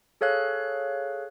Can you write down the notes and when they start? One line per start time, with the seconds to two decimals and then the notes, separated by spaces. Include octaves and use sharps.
0.21 G#4 A4 C#5 F5 F#6